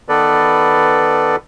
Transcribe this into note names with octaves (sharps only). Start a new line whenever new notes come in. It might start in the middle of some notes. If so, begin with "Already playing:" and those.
D#3 B3 A4 B4 D5